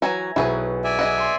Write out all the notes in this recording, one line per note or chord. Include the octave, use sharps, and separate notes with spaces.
E3 F#3 F#4 E5 G#5 A#5
B1 B2 E4 G#4 B4
D5 E5 G#5
G#4 D#5 F#5
C6